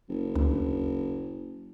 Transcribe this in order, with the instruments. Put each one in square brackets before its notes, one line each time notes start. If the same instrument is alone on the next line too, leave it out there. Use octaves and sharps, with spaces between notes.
[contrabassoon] F#1
[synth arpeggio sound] D2